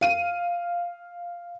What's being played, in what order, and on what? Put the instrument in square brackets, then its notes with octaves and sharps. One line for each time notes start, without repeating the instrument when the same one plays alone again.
[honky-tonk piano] F5 D#7